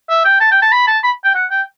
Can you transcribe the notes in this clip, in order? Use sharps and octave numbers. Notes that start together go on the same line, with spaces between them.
E5
G5
A5
G5
A5
B5
A5
B5
G5
F#5
G5